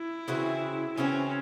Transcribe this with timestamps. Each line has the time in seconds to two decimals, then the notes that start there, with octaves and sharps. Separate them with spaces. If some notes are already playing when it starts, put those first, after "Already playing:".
Already playing: E4
0.28 C#3 E3 C4 F#4
0.97 C#3 E3 C4 C#4 F#4